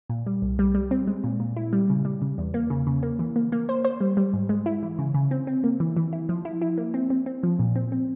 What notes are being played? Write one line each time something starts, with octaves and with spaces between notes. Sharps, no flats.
A#2
G3
C2
G3
G3
C4
G#3
A#2
A#2
E4
G3
C#3
G3
C#3
E2
A#3
C#3
C#3
A#3
E3
A#3
A#3
C5
C5
G3
G3
G#2
G#3
E4
E3
C#3
C#3
C4
C4
A#3
E3
E3
E4
F3
E4
E4
A#3
C4
C4
C4
F3
A#2
C4
C4